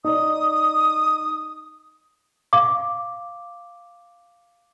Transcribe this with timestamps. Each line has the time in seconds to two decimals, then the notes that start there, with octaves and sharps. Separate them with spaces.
0.04 D#4 D5 D#6
2.53 F5 D6